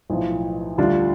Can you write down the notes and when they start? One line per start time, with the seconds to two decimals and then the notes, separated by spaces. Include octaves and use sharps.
0.10 B1 A2 F3
0.78 D2 D3 G3 D4 F4